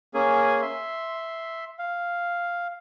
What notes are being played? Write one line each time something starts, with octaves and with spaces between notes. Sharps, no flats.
A#3 C#4 G#4 G#5
E5 C6
F5